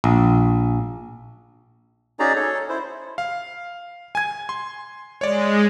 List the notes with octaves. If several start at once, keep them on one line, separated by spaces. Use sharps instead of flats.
A#1
C#4 D#4 F#4 G#4 D5 A#5
A4 C#5
E4 C5
F5
G#5 G#6
C6
G#3 C#5 D5